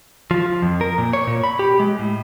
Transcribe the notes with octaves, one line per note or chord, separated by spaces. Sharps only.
F3
F2
A#4
A#2
C#5
A#2
B5
G4
G#3
A2